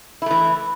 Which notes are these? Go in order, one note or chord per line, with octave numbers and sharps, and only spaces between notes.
E3 A3 E4